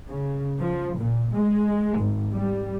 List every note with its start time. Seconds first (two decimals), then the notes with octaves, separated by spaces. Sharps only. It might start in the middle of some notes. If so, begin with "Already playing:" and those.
0.10 C#3
0.58 F3
0.97 A#2
1.34 G#3
1.98 G#1
2.32 G3